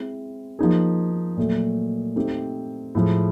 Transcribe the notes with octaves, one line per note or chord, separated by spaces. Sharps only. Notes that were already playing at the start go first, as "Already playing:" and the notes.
Already playing: G#3 C4 E4
F3 A#3 D#4 G#4
A#2 F#3 A3
A3 C4 D#4 G4
A2 F3 G#3